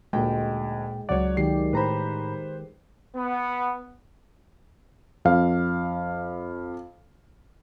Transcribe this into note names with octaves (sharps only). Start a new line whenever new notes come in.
D2 A#2 G#3 G5
C#2 F#3 C#5 D5 F#5
D#3 G#3 G4 C7
A2 B4 C5 A#5 B5
B3
F2 F5